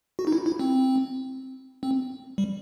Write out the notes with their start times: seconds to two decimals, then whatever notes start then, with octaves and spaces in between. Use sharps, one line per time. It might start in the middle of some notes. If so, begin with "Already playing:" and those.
0.19 F#4
0.27 D#4
0.32 E4
0.46 E4
0.59 C4
1.83 C4
2.38 G3